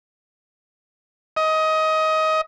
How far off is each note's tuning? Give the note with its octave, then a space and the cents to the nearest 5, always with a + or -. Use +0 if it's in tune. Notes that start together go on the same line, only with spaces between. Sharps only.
D#5 +20